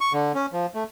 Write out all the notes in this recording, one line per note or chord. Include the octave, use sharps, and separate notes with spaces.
C#6
D3
C#4
F3
A3